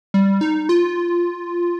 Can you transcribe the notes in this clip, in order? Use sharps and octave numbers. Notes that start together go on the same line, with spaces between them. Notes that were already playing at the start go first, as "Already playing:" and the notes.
G3
D#4
F4